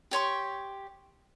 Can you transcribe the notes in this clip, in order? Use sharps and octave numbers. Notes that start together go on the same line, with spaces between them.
G4 C#5 C6 C#6